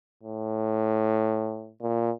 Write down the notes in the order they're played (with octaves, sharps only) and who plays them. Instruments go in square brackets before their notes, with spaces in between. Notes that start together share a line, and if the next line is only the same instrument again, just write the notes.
[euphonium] A2
A#2